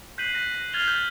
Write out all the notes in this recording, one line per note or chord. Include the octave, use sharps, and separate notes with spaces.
F#6 G6 B6 C7 D#7 F#7
F#6 A#6
F6 G#6 A6 C7 F7 G7
G6